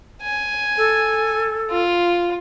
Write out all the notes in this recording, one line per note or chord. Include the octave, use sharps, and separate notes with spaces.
G#5
A4
F4